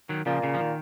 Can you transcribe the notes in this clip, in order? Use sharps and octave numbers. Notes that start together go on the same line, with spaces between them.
D#3 F#3
A#2 C#3 F3
C#3
F3
D#3